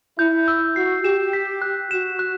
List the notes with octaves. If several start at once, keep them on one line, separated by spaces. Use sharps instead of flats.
E4 G6
E6
F#4 C7
G4 E7
B6
F#6
F#4 E7
F#6